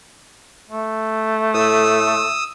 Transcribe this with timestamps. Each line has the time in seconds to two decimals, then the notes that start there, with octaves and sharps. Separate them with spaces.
0.70 A3
1.54 A2 D#6 E6